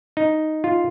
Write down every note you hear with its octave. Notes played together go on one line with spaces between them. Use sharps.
D#4
F4